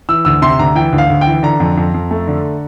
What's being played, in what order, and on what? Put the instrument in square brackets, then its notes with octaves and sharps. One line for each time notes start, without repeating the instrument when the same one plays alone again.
[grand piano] E3 E6
D2 E6
C3 C6
D2 A#5
E3 G5
D2
F5
D2
G5
E3
D3 A#5
F2
F2
F2
A3
D3